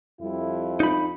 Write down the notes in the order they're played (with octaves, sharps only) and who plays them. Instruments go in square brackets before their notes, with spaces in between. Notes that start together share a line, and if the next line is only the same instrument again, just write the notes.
[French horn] F2 [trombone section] G3 E4
[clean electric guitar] D#4 B5